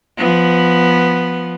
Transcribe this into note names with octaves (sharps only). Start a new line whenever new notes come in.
F3 B3